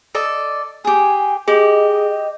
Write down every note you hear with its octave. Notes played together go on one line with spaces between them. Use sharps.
A4 D5 D#5
G4 G#4 G#5
G4 G#4 D#5